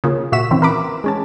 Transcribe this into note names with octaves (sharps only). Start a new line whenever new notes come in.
C#3 A#3 F4
A#2 F#4 E5 C#6 B6 E7
D#3 E3 C4 C#4 E4
A#4 B4 B5 D6
G#3 C#4 A5